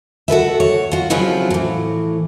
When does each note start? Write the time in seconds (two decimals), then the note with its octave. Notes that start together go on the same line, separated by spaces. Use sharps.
0.28 F#4 A4 B4 E5
0.60 C#5
0.92 F4 F#4
1.10 C#3 F3 F#3 C4 E4 F4
1.50 A2 E3